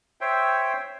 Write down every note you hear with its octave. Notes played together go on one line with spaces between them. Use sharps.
C5 C#5 E5 G5